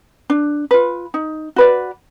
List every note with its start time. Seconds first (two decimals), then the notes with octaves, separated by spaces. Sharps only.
0.30 D4
0.71 F4 B4
1.14 D#4
1.56 F#4 B4 D5